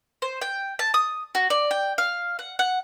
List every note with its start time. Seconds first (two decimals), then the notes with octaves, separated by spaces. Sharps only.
0.22 C5
0.41 G5
0.79 A5
0.94 D#6
1.35 F#4
1.50 D5
1.71 G5
1.98 F5
2.39 F#5
2.59 F#5